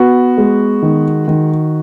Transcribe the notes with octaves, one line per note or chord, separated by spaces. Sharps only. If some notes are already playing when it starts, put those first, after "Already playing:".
Already playing: B3 F#4
G#3
D#3
D#3